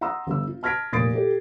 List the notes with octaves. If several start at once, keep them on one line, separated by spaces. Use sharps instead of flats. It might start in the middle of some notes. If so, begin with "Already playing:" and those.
F#5 A#5 C6 D#6 E6
G1 E6
F4
A5 F6 G#6 A#6 B6 D7
F1 A#2 D#6 A6 C7 D7
G4 A4